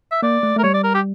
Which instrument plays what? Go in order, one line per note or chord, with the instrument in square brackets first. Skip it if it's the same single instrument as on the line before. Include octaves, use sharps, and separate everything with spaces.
[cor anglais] E5
[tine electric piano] A#3 [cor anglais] D5
[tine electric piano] A3
[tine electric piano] A3 [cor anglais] A#4
[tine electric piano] G3 [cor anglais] C#5
[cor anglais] D5
A#4
G4